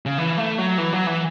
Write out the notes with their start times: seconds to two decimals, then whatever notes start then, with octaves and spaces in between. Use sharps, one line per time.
0.06 C#3
0.18 E3
0.38 A3
0.58 F#3
0.78 E3
0.93 F#3
1.07 E3